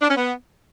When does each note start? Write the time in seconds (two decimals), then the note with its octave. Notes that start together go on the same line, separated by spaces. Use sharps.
0.02 D4
0.09 C#4
0.16 B3